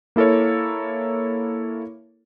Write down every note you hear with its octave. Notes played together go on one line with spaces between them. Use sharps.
A#3 E4 A4 A#4 C#5